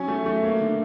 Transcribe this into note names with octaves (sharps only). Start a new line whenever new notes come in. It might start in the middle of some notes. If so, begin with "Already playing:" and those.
Already playing: F#3 C#4 G#5
A3
A3
A#3
D3